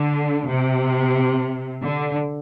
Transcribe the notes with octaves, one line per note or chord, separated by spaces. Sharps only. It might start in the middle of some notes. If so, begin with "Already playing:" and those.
Already playing: D3
C3
D3